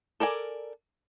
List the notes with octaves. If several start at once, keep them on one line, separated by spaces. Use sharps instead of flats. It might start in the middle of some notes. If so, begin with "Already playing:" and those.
A4 A#4 D5 G#5